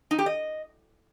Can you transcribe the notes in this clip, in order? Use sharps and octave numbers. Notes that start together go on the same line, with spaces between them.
D#4
G4
D#5